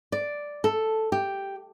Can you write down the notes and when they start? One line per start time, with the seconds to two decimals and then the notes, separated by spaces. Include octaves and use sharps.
0.12 D5
0.64 A4
1.12 G4